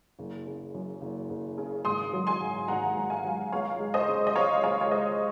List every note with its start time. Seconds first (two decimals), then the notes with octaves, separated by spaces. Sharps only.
0.19 F#1
0.46 C#3
0.74 F#2
1.01 F#1
1.30 F#1
1.58 C#3
1.85 G#1 C6 D#6
2.13 F#3
2.27 G#5 C6
2.41 G#2
2.68 G#1 F#5 A#5
2.97 G#1
3.10 F5 G#5
3.24 F#3
3.52 C#2 C#5 F5
3.80 G#3
3.94 C5 D#5
4.08 C#3
4.27 D#5
4.35 C#2 C#5 F5
4.63 C#2 C#5 F5
4.81 C#5
4.91 G#3 C5 D#5